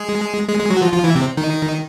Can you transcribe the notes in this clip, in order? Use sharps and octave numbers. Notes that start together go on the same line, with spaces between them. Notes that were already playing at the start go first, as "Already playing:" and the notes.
Already playing: G#3 G#4
G#3 G#4
G#3 G#4
F#3 F#4
F3 F4
F3 F4
E3 E4
C3 C4
D#3 D#4